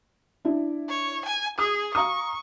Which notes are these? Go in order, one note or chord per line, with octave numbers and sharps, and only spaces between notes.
D4 E4
C#5
G#5
G#4 D#6
F5 A#5 C#6 D#6